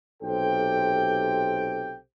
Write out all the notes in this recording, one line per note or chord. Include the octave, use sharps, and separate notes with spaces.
B1 C3 G4 A4 C5 G5